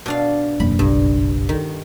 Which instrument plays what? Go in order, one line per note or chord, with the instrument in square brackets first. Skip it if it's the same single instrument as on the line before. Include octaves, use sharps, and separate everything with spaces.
[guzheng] B2 D4 F5
[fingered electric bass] E1 F#2 A#3 [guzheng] B5
[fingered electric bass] F#1 B1 [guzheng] G2
[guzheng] D#3